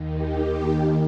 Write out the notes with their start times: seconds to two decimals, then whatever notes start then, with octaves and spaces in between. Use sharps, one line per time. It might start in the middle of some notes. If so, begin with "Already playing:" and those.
Already playing: D#2 D#3
0.12 G4
0.41 D#2 D#3